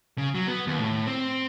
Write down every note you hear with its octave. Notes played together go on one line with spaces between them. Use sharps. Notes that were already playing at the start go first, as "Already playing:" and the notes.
C#3
F#3
B3
D#2
A2
C4